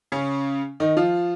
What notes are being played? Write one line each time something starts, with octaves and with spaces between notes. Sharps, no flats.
C#3 C#4
D#3 D#4
F3 F4